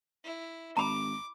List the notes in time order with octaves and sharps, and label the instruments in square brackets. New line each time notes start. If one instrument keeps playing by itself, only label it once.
[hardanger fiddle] E4
[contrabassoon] G#1 [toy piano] A#5 B5 [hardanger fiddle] D6